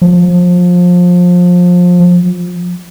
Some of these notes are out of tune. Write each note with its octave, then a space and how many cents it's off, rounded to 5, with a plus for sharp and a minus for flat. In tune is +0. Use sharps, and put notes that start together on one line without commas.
F3 +25